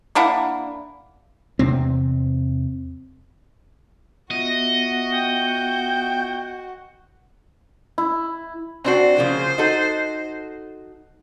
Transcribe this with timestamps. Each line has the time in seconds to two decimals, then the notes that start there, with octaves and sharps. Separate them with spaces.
0.15 A#3 D4 E4 F#5
1.59 E2 C3 C4
4.30 B3 F4 F#4 D#5 E5 F#5
5.13 G5
7.98 E4
8.85 C4 D4 F#4 C5
9.17 C#3 F3 A#3
9.58 D#4 F#4 A4